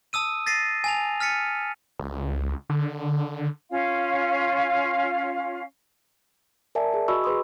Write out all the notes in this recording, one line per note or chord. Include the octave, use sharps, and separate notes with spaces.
A5 D#6 E6 D#7
A6 A#6 C7 D#7
G#5 A5 F7
F6 A6 B6 C#7 D#7
C#2
D3
C#4 F4 F5
A#4 D5 E5 G#5 A5
G#4
F#4 D#5 G#5 B5 C#6 E6
G#4 B4 C6 D#6